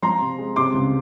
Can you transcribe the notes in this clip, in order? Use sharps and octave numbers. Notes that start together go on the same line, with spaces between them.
F3 A#5 C6
C3
G#3
C3 C6 D6
C#2